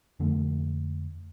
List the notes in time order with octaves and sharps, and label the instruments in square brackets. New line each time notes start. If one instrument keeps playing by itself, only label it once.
[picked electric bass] F2 D3 A3